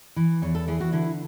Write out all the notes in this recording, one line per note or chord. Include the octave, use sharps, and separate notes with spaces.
E3
E2 C#5
A4
E3 G#4
F#4
D3 E4